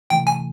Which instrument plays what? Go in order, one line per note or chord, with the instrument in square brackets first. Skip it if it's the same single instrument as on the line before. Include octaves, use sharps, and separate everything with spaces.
[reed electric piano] D2 C3 E3 A3 [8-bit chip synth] G5
[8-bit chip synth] G#5